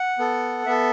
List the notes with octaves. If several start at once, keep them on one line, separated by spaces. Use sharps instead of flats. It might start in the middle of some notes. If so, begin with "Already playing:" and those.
Already playing: F#5
B3 A4
B3 A4 E5